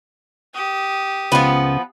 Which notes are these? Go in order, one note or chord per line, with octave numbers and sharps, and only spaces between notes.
G4 D#6
C#2 F3 B3